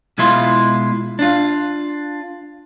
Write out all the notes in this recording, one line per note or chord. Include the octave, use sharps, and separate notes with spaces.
B2 G#3 E4 F4 C6
D4 F4